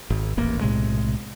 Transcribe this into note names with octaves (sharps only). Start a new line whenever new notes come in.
G#1
D#1 A1 A#3
B1 A2 C3 G#3